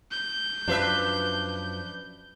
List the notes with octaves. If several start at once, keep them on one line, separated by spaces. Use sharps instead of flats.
G6
F#2 F3 D4 B4 E5